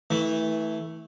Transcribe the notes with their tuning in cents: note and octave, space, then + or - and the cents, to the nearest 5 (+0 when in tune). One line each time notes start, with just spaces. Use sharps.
E3 -25 A3 +0